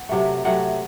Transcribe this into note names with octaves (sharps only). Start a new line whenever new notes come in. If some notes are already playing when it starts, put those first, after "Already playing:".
Already playing: F#5
C3 F#3 A3
C3 F#3 A3 F#5